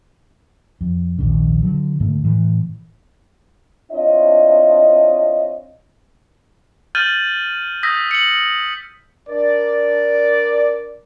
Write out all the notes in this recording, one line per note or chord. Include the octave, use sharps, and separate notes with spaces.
F2
A#1 D#2 G#2 C#3
D3 F#3
E2 G#2 D3 A3
A2 E3
C4 D4 E4 F4 C#5 D#5
F6 G6 A6 D#7 F#7
D#6 E6 G6 A#6 B6
C#7 F#7
D4 A#4 D5